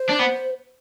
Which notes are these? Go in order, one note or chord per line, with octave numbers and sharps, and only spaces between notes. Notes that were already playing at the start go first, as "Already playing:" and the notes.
Already playing: C5
D4
B3